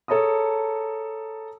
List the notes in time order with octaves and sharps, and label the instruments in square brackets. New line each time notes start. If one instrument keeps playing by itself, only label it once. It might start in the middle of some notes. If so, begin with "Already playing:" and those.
[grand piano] G#4 A4 C#5 A5 A#5 D#6